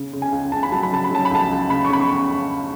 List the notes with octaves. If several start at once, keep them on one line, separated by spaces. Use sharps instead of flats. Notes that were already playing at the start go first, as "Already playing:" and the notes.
Already playing: C#3
C#3
G#5
C#2
C#2 A5
B5
F#3 A5
B5
C#3 A5
B5
F#3 A5
B5
C#2 A5
C#2
C#3 B5
C#6
C#3 B5
C#6